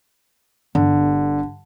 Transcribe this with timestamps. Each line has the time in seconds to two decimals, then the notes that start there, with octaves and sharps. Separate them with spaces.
0.75 G1 D3